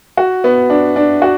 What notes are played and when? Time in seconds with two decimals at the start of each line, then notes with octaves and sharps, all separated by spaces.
0.17 F#4
0.44 B3
0.70 D4
0.96 D4
1.22 F#4